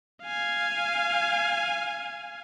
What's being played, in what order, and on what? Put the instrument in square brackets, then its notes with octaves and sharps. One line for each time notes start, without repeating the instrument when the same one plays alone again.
[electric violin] F5 G#5